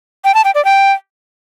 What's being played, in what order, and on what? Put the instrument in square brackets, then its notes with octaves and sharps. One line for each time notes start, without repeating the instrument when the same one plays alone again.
[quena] G5
A5
G5
D5
G5